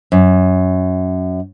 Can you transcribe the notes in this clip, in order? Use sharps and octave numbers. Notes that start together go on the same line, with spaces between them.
F#2